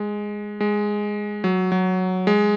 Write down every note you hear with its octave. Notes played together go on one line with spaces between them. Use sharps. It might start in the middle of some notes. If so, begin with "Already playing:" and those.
Already playing: G#3
G#3
F#3
F#3
G#3